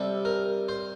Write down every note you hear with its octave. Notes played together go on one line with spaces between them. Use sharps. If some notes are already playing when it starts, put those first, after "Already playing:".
Already playing: C3 G3 A4
A#4
C5